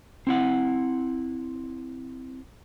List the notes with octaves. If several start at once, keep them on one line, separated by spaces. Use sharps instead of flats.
C4 E4 F#5